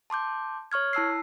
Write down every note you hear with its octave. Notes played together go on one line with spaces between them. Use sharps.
A5 C6 D6 G6
C#5 C#6 F6 G#6
E4 A5 E6 C7